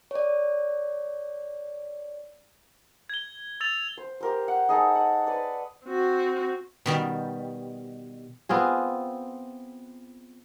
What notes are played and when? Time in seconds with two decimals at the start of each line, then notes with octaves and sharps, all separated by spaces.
0.11 C#5 D5
3.10 G#6 G7
3.61 E6 A6 F7
3.97 C5
4.21 G4 A#4 C5
4.48 F#5
4.69 D#4 G#4 A4 C5
4.95 F#5
5.27 B4 D5
5.86 C4 F#4
6.86 B2 D#3 G3
8.49 B3 C4 F4 G#4